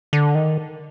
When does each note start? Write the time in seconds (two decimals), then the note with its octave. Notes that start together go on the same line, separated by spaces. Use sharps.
0.13 D3
0.35 D#3